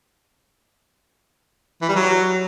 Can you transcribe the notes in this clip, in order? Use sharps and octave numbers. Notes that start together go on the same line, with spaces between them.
E3
G3
F#3